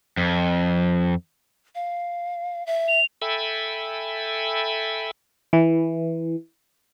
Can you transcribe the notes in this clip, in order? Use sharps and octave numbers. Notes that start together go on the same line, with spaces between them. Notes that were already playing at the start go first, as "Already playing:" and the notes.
F2
F5
E5
F7
A4 E5 G5 G#5 B5
E3